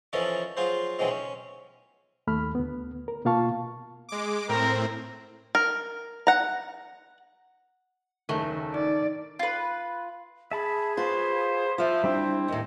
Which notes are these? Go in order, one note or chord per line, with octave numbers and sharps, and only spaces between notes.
E3 F3 C#4 A4 A#4 D#5
F#3 F4 G#4 C5
B1 E3 F#3 G#3 C4 D#4
C#4
D#2 A3 B5 F6
D2 B3
A#4
B2 A#3 F4 F5 A5 C#6
G#3 D6
A2 C4 A#4
A#4
F#5 A#5
F#1 D#2 D#3 A3
D#4 D5
F4 B4
G#4 E5 A5 B5
F4 F#4 B4 C5
F3 F4 C5 E5
G3 C4 D4 E4
D#2 A2 D#5